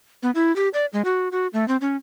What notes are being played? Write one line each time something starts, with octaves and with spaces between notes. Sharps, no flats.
B3
E4
G4
D5
G#3
F#4
F#4
A3
C4
C#4